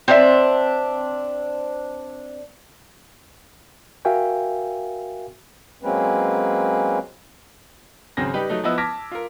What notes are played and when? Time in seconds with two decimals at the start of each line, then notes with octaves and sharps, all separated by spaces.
0.08 C4 D4 E5
4.05 F#4 A#4 E5 F5 G5 G#5
5.83 F#3 G#3 A#3 C4 C#4 B4
8.17 G#1 C#3 F#3 C4 G#5 A#6
8.34 G3 D#4 G4 B4
8.49 F#3 A3 D#4
8.64 F3 B3 E4 D#5 E6
8.78 A5 D6 F6 G#6 A#6 B6
9.11 F4 A#4